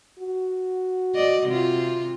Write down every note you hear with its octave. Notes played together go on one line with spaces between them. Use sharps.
F#4
D5 D#5
C3 F4